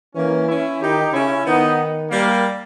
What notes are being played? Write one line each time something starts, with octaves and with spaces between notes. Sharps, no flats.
E3 A#3 C#4
C#4 E4
D#3 D#4 G4
C#3 C#4 E4
D#3 B3 D#4
G3 A#3